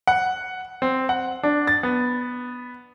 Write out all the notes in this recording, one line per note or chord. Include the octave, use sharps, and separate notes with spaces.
F#5
C4
F#5
D4
A6
B3